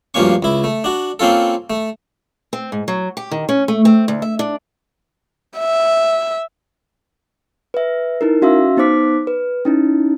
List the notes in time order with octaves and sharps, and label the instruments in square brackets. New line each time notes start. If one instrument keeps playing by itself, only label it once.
[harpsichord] D2 G2 F3 A#3 C#4 C#6
C#2 E4
A3
D4 F#4
A#3 C4 C#4 F4 A4
A3
[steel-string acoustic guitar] C4
G#2
F#3
G4
D#3
C#4
A3
C4
D2
E5
D4
[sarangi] E5
[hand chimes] B4 E5
D#4 E4 A#4
C#4 F#4 E5 F5 E6
B3 D#4 C5 D6 B6
B4
C#4 D#4 E4